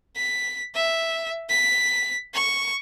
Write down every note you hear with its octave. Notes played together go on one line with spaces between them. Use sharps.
B6
E5
B6
C#6